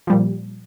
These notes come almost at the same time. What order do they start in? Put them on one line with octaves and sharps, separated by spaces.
F3 G3 A#2